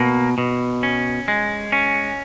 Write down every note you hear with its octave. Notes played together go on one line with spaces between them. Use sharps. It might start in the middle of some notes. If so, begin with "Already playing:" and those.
Already playing: B2 A#3
B2
C#4
G#3
C#4